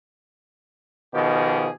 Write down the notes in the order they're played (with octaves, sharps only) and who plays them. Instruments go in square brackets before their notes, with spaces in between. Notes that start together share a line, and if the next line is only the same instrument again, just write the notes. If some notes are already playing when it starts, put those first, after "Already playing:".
[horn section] B2 D#3 F3 G4 G#4